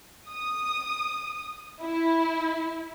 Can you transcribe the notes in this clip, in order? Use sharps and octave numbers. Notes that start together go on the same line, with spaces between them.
D#6
E4